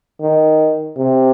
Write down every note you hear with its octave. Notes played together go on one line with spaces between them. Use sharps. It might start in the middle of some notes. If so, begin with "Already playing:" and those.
D#3
C3